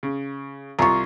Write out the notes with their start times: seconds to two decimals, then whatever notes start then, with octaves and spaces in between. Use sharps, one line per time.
0.03 C#3
0.79 C2 F4 A#5 C#6